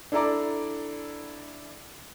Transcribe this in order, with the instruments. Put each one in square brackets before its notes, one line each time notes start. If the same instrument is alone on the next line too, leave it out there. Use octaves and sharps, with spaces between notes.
[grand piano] D4 E4 A4 D5 A#5 D6